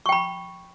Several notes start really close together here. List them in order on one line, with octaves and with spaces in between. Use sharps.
C#6 G5 B5